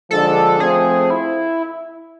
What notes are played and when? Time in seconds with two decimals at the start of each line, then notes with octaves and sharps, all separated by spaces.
0.11 D3 F3 G#3 D4 A4
0.60 F3 A3 C4 G#4
1.10 E4